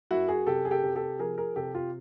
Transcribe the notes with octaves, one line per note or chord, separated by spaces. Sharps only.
F#2 E4 F#4
F#4 G#4
C3 G4 A4
G#4
G4 A4
C3
G4 A4
F3 G#4 A#4
G#4 A#4
C3 G4 A4
F4 G4